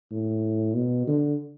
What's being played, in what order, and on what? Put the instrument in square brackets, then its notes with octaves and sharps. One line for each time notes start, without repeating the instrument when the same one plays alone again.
[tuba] A2
B2
D3